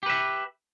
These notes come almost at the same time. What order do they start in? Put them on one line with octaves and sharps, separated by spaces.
G4 B4 E5